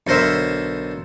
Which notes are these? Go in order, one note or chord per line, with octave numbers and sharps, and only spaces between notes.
B1 D3 A#4 C5 E5